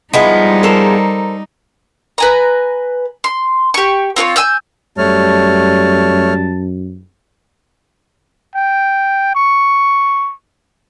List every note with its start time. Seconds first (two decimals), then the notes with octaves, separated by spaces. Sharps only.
0.13 F3 G3 G#3 B3 D#4 E4
0.63 A4 A#4 C5
2.18 B4 G#5 A#5
3.24 C6
3.74 G4 C#6
4.16 C4 F4 A#4 C#5
4.36 G#5 E6 G6
4.98 F#2 G3 A3 C#5 A5 F6
8.55 G5
9.36 C#6